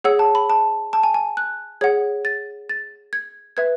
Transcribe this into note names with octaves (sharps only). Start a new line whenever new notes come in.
G#4 C#5 F#5 E6
A5
B5
A5
A5
G#5
G#5
F#6
G#4 C#5 F#5 G#6
A6
A6
G#6
B4 E5 G#6